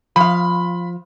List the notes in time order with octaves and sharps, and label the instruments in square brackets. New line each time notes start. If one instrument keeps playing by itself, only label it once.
[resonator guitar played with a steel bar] F3 F5 [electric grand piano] B5